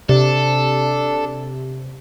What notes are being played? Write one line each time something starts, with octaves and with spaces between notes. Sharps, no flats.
C3 D4 A4